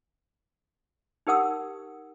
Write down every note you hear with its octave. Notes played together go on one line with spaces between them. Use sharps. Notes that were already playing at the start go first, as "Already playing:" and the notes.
D#4 G4 A#4 F#5 D#6 E6